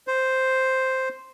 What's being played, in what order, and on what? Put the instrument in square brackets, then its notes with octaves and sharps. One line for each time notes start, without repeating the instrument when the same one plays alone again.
[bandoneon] C5